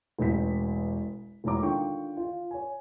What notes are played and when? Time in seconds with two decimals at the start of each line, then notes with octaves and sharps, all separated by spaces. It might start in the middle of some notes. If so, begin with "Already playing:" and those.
0.19 E1 A1 B6
1.44 E1 A2 E4 C#5 A#5 D6
1.62 D3 D#3 F4 G5 C#6
2.17 F4
2.51 C#5 G#5